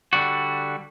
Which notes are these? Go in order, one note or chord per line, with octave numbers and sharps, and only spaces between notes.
D3 G3 F#4